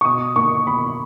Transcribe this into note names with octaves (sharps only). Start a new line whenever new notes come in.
C#6
B2 D#6
A#3 C#6
B2 B5